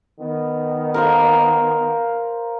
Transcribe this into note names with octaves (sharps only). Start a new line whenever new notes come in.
D#3 B3
A#4 C5 F5